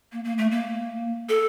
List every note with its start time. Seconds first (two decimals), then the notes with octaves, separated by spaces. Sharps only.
0.12 A#3
0.24 A#3
0.38 A3
0.51 A#3
1.29 A4